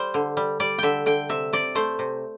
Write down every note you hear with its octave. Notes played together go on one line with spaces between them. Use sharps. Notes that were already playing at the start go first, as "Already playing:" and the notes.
Already playing: G3 C5
D3
G3
G3 D5
D3 E5 G5
D3 G5
C3 E5
C3 D5
A3 C5
C3